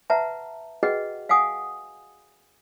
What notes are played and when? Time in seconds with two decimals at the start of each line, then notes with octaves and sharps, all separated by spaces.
0.10 B4 E5 F#5 A5 A#5
0.83 F#4 G#4 B4 D#5 F#5 G5
1.29 F5 F#5 G#5 D#6